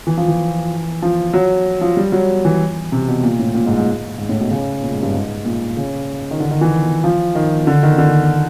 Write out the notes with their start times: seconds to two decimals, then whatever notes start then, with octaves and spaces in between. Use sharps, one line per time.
0.07 E3
0.17 F3
0.28 E3
1.02 F3
1.34 F#3
1.81 F3
1.97 G3
2.12 F#3
2.45 E3
2.92 C3
3.08 B2
3.23 A#2
3.39 A2
3.55 A#2
3.66 G#2
3.76 G#2
4.18 G#2
4.29 A2
4.40 B2
4.50 C#3
4.82 A#2
4.92 G#2
5.02 G2
5.14 G#2
5.45 A#2
5.77 C#3
6.31 D#3
6.40 D3
6.51 D#3
6.61 E3
7.04 F3
7.35 D#3
7.67 D3
7.83 D#3
7.98 D3